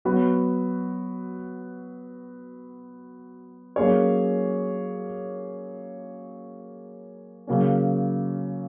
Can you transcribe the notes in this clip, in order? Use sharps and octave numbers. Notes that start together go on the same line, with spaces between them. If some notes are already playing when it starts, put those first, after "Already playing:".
F#3 B3 F#4
F#3 A#3 C#4 G#4 C#5
C#3 F#3 A#3 C#4